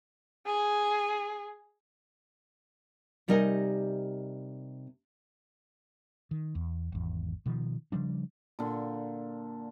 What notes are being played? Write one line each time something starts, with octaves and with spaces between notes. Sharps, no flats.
G#4
C3 G3 D#4 A#4 D#5 G#5
D#3
E2
G#1 E2
B2 D#3 F3
C#3 F3 G3 D4
A#2 D3